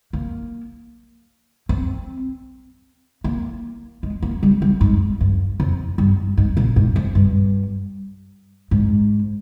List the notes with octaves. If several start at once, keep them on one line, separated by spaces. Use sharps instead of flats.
A#3
C4
A#3
G#3
A#3
G3
G3
G#2
G2
F2
G2
G#2
A#2
G#2
F2
G2
G#2